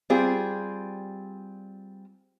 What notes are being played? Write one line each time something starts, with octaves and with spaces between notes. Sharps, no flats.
G3 C4 F4 G#4